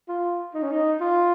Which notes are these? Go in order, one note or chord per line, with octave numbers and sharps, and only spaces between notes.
F4
D#4
C#4
D#4
F4